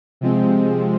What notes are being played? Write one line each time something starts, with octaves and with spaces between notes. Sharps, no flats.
C3 F3 G#3 C4